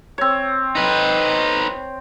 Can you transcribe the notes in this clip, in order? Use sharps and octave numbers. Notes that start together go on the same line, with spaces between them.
C4 C#5
D#4 B4